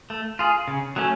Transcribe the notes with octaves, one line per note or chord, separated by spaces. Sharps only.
A3
F4 G#4
C#3
F#3 A3 C#4